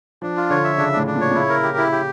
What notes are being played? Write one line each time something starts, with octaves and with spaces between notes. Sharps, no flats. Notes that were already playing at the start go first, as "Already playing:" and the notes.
F3 D4
F4
D3 C#5
E5
C#3 D4
A2 D4
D4
A#2
C#5
A#2
C#3 E4
A#4
G4
E4
G4